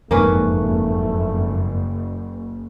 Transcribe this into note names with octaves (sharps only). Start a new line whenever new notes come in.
F#1 F2 G#2 A3 A#3 C#4 B4